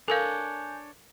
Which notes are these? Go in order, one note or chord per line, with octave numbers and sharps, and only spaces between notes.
D4 A4 A#4 C#5 F5 G#5 G6